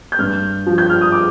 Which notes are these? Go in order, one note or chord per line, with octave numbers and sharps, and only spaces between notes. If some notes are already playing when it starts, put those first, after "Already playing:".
G6
G2 F6
F3
G6
F6
D#6
D6